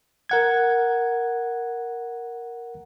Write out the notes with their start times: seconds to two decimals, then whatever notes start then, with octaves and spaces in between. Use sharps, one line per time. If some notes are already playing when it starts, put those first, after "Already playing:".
0.30 A#4 F#5 G#6